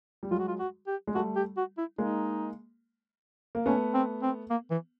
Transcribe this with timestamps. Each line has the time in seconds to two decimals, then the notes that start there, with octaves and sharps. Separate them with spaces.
0.23 G3
0.31 F#3 G#3 F4
0.40 F#4
0.48 F4
0.59 F#4
0.87 G4
1.07 G#3
1.15 G3 A3 F#4
1.36 G4
1.57 F#4
1.78 E4
1.98 G#3 A#3 D#4
3.55 A#3
3.66 A3 B3 C#4
3.94 C4
4.22 C4
4.50 A#3
4.71 E3